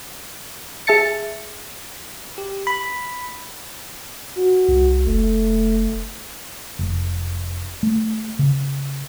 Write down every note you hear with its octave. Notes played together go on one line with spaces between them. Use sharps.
G#4 E5 A5 A6 C#7
G4
B5
F#4
C2
F1 A3
F1
A3
C#3